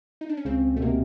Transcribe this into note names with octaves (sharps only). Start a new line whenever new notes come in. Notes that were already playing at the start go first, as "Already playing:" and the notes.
D#4
D4
C#4
C#2 C#3 C4
B2 A3
C3 A#3